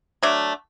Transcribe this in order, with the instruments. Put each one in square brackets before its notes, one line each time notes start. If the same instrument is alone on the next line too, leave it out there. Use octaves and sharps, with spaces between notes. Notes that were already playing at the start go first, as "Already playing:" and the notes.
[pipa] F#3 A3 D4